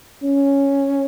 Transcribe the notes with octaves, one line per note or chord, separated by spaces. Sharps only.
C#4